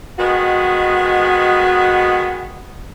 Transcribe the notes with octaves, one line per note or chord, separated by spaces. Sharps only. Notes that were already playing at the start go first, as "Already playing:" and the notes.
D#3 G#3 B3 F#4